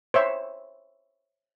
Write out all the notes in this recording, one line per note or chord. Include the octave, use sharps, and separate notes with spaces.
C5 C#5 E5